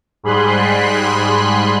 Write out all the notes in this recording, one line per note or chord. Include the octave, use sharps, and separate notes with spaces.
G#2 G3 G#4 B5 C6 F#6